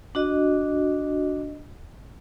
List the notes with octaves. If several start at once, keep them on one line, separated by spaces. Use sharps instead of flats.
D4 F#4 D#5